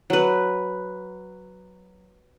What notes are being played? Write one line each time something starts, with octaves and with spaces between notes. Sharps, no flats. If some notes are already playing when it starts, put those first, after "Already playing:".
F#3 B4